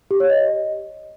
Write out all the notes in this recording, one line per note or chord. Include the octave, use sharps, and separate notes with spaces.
G4
C#5
D#5